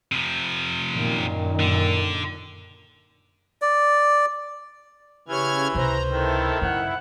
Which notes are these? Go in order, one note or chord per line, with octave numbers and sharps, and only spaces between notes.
C3 F3
F#2 A#2 D#3
D3
D5
C#3 E3 G4 C#5 F6 G#6
C#2 C3 B4 C5 A#5
D#3 E4 A4
F#2 C#3 E4 F#5